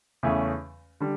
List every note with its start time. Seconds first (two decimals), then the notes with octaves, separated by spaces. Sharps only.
0.23 E2 C#3 E3 A3 C#4
1.00 D3 G3